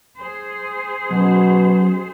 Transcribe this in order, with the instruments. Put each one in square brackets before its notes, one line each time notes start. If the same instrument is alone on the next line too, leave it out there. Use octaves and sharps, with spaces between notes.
[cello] G#4 C5
[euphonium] B2 [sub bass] F#3 [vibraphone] C#4 F#4